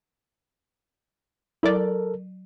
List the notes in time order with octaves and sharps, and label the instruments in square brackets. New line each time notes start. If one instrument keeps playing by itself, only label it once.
[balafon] F#3 [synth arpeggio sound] E4 D5 [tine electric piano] A4 A#4